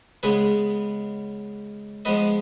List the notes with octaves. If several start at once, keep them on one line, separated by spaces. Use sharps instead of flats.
C#3 G#3 B3 G#4 B4
F3 G#3 B3 B4 D#5